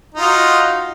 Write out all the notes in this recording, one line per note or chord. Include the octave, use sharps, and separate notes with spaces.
D#4 F4 F#4